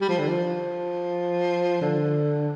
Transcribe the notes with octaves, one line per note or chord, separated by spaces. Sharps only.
G3
F3
D3
F3
D3